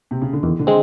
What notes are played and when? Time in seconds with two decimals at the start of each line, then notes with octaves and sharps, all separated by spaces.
0.11 C3
0.22 C#3
0.33 D3
0.43 E2 D#3
0.59 D3
0.67 G#3 C4